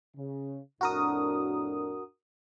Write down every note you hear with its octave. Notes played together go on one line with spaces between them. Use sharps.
C#3
F2 A2 D4 F#4 A#4 D#6